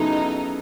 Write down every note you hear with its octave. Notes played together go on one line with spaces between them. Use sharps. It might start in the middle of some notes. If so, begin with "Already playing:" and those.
Already playing: C#3 F#3 B3 D#4 E4 A4